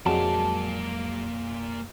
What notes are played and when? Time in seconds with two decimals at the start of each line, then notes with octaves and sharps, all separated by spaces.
0.06 F2 F#3 G#3 A#3 D5 A5